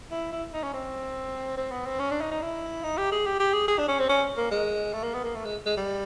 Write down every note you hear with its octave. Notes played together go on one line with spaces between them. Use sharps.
E4
E4
D#4
C#4
C4
C4
B3
C4
C#4
D4
D#4
D#4
E4
D#4
G4
G#4
G4
G4
G#4
G#4
D4
C#4
C4
C#4
A#3
G#3
A3
A#3
B3
A#3
A3
G#3
G#3
G3